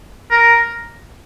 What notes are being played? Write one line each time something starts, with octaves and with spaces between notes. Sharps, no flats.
A#4